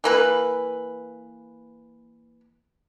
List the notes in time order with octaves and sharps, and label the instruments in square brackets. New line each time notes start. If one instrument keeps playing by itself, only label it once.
[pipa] E3 A#3 B4